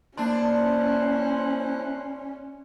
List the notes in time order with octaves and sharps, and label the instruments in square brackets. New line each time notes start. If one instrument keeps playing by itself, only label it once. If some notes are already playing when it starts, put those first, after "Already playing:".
[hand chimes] A#3 A5 C6 [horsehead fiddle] C#4 [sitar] D4 [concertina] E4 C5 F#6